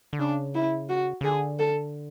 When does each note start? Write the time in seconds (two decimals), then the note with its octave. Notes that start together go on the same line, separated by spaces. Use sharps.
0.13 D3
0.19 C#3 D4
0.55 E4
0.89 F#4
1.21 C#3
1.24 D3 G#4
1.60 A4